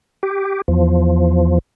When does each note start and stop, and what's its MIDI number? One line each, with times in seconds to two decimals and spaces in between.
0.23 0.62 67
0.68 1.59 40
0.68 1.59 53